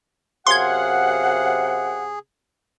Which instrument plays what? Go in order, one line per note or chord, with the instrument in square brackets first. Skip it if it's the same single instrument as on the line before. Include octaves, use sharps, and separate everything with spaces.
[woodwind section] F#2 F5 F#5 [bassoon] C3 [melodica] G#4 [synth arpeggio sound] C6 G#6